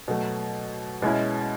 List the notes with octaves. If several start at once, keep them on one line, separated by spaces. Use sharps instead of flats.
B2 F#3 A3
B2 G#3 C#4 E4